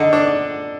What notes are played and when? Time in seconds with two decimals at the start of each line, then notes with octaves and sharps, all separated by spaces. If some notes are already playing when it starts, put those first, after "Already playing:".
Already playing: D3 D#4
0.13 D4